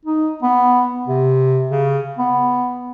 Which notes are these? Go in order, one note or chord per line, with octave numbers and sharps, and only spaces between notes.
D#4
B3
C3
C#3
B3